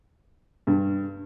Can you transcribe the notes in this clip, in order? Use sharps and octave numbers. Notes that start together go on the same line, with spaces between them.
G2